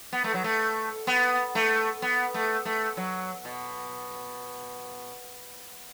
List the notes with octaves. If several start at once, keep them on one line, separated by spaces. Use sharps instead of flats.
B3
A3
F#3
A3
B3
A3
B3
A3
A3
F#3
B2